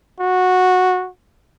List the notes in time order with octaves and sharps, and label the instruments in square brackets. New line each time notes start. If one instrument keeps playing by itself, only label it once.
[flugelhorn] F#4